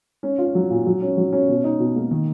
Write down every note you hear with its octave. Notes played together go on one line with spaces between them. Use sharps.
C#4
F4
F#3
A#2
F#3
C#4
F#3
C#4
B2
D#4
B2
A#3
D#3